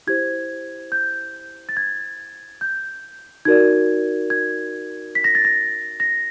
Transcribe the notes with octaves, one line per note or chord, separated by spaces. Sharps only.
E4 G4 C5 G#6
G6
A6
G#6
G6
D#4 F#4 A#4 D5 G#6
G#6
B6
A#6
A6
A#6
A#6